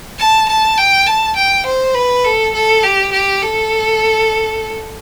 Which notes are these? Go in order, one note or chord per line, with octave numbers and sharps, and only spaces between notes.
A5
A5
G5
A5
G5
C5
B4
A4
A4
G4
G4
A4